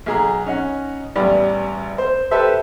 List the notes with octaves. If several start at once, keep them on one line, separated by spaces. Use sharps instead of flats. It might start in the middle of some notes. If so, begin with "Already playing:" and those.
B1 G#4 A#5
C#4 D#4 F#5
A1 E2 G3 D5 B5
C5
G4 A4 B4 C5 E5